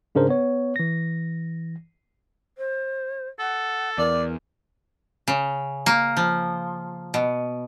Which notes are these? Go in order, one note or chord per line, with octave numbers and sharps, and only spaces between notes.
G#2 C#3 D4 A#4 C5
B3 C#5
E3 A#6
C5
A4 F#5
E2 A#4 D5
C#3
A#3
F3
B2